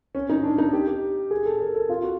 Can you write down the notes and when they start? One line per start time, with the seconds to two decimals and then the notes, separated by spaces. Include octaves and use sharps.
0.15 C#4
0.29 D#4
0.43 D4
0.58 D#4
0.73 G4
0.88 G4
1.31 G#4
1.46 A4
1.60 A#4
1.75 A4
1.89 F4
2.03 F#4